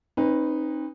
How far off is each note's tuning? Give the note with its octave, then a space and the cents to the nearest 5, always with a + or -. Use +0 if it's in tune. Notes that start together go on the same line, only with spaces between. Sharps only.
C4 +40 D#4 -5 B4 +0